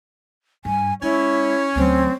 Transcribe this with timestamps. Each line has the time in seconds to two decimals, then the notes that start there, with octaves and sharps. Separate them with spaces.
0.65 G2 G#5
1.02 G#3 C#4 E4 C#5
1.75 D2 F#3 C4